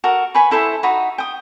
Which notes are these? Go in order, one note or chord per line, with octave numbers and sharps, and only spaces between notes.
F#4 A4 A#4
B4 G#5 B5 C#6
E4 A4 C5 E5
D#4 F#4 B5
G5 D#6